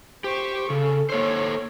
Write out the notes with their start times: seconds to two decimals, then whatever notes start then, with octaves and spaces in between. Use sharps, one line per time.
0.24 G4 C5 C#6
0.70 C#3 A4
1.10 A#3 A4 C5 C#5